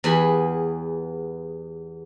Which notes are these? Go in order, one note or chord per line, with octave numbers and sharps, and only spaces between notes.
E2 B3 G4 G#4 G#5 B5